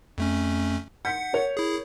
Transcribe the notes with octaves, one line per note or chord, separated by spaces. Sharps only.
F2 A3 C#4
F#5 G6 B6 C#7
A#4 C#5
E4 G#4